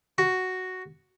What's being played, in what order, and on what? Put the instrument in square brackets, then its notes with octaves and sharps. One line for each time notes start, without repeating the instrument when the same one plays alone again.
[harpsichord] F#4